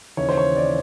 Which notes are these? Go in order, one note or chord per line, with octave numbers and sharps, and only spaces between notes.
D#2 C#3 E3 C#5
C5
C#5
D5